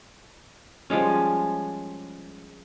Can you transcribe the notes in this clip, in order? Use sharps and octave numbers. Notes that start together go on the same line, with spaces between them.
F3 G3 G#3 C#4